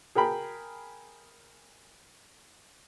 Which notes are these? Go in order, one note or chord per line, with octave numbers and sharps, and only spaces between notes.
G#4 A#4 G5 B5